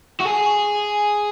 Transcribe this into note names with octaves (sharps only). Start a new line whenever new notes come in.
F#4
G#4